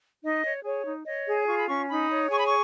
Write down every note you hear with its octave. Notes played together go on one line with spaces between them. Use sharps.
D#4 D#5
C#5
G#4 C#5
D#4
C#5 D#5
G#4
F4 C#6
B5
C#4 C#6
D#4 B5
C#5
G#4 C#6
B5
C#6